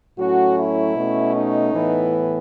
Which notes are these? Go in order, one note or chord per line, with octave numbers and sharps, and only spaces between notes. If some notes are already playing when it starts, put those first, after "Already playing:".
A2 F#3 A3 C#4 F#4
E4
B2 A3 C#4
D#4
A2 E3 B3